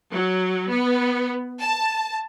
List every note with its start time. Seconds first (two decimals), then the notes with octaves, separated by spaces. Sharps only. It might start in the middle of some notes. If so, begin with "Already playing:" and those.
0.12 F#3
0.70 B3
1.59 A5